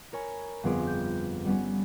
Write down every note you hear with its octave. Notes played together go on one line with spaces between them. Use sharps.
A#4 C#5 G#5 B5
G1 F2 B3 F4 G#4 D6
G6
G3 B3 C#4